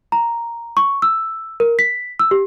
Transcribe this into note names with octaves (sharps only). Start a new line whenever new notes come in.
A#5
C#6
E6
A#4
B6
E6
G4